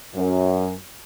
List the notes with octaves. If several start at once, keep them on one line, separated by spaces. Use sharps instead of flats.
F#2